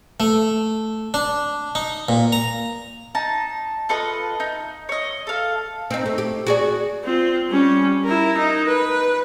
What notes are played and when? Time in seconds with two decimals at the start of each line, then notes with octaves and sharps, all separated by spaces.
0.20 A3
1.14 D4
1.75 D#4
2.09 A#2
2.32 A#5
3.15 D#4 A5
3.89 F4 A4 B4 D#5
4.40 D#4
4.89 C#5 D#5
5.27 A4 F5
5.90 C4 D#4
6.06 A3
6.18 G4
6.46 F#4 G#4 D5
7.04 C4 F4
7.49 G3 C#4
8.04 E4 A#4
8.37 D#4
8.66 B4